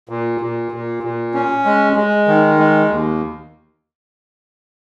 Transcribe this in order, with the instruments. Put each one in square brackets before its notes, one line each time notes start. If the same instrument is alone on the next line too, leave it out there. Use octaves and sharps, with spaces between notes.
[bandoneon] A#2
A#2
A#2
A#2
C#4
G#3
G#3
D#3
G#3
D#2